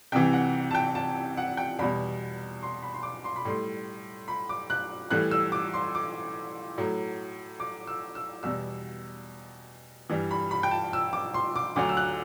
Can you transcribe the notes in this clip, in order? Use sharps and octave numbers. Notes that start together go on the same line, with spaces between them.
C2 C3 E3 G5
F#5
A5
G5
A5
F#5
G5
E2 B2 G3 B5
C6
B5
C6
D6
C6
B5
A2 G3 C6
B5
D6
F#6
A2 E3 G3 F#6
E6
D6
C6
D6
A2 F#3
D6
E6
E6
E2 B2 G3 E6
G2 E3 G3
B5
B5
G5
A5
E6
D6
C6
D6
D2 D3 F#3 D6
E6
F#6